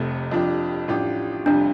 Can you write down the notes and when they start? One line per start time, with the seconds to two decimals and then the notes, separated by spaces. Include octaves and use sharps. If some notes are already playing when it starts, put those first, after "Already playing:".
Already playing: F1 F2 C3 A3
0.31 F1 F2 F3 D4 G4
0.88 A1 A2 F3 D4 G4
1.46 F1 F2 C3 G3 D4 F4